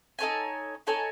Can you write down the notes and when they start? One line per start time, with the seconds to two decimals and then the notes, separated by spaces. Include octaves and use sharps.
0.19 D#4 A4 C#5 G#5
0.87 D#4 A4 C#5 G#5